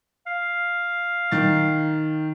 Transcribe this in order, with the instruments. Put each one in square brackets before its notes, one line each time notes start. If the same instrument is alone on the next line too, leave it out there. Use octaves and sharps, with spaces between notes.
[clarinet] F5
[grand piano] D#3 A6